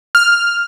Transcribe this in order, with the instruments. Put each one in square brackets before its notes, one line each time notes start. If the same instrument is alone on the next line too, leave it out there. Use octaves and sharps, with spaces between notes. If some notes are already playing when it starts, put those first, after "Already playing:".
[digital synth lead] F6